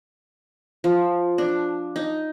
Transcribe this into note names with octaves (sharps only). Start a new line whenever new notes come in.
F3
D4
D#4